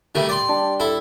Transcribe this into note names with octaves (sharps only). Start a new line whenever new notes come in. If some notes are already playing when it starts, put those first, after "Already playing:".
D#3 G3 A3 G4
D5 C6
G3 D4
E4 A4